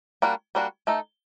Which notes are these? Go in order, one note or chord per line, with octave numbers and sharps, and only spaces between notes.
G3 A#3 D4 F#4
G3 A#3 D4 F#4
A3 D#4 A4